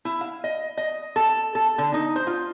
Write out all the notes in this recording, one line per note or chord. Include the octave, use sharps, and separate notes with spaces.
E4
F5
D#5
D#5
A4
A4
D3
D#4
C5
F4